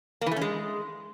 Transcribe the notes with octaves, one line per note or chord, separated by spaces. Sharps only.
A#3
E3
A3
C#4
G#3